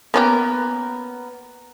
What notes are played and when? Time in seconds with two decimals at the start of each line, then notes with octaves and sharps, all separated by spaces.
0.14 A#3 B3 C#4 G4 A#4